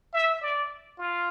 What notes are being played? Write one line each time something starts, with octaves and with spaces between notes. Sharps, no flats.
E5
D5
F4